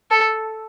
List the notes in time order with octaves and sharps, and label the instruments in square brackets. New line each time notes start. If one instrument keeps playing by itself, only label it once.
[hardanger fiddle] A4